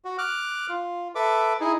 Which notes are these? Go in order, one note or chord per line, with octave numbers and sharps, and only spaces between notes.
F#4
D6 F6 F#6
F4
A4 B4 E5 D6
D#4 E4 G#4